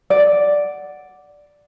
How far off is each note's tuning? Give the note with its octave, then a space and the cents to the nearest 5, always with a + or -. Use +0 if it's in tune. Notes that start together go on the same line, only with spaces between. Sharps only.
D5 +0 F#5 +0